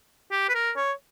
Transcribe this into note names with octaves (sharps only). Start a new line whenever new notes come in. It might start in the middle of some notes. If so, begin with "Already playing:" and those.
G4
B4
A#4
C#5